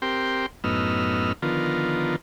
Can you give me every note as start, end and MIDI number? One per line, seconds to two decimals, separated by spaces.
0.02 0.46 60
0.02 0.46 67
0.02 0.46 70
0.02 0.46 79
0.02 0.46 84
0.64 1.32 42
0.64 1.32 45
0.64 1.32 59
0.64 1.32 63
0.64 1.32 88
0.64 1.32 89
1.42 2.16 50
1.42 2.16 51
1.42 2.16 53
1.42 2.16 59
1.42 2.16 65
1.42 2.16 70